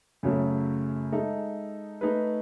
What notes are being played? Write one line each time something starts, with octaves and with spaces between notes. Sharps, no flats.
F#2 C#3 F#3 A3
G#3 D#4 A4 E5
A3 D#4 G#4 B4